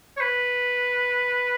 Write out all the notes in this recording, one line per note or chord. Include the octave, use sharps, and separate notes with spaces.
C#5
B4